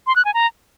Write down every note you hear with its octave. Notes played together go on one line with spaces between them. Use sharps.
C6
F#6
G#5
A#5